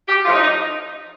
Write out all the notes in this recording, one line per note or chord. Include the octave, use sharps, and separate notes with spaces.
G4
A2 F3 D#4 F4
D#4